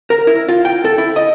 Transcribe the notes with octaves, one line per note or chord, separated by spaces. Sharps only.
A#4
E4
F4
G5
A4
E4
D#5